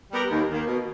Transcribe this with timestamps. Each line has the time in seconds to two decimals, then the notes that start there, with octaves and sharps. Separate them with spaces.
0.12 G3 B3 G4 A#4
0.31 D#2
0.49 D#3 A#3
0.67 B2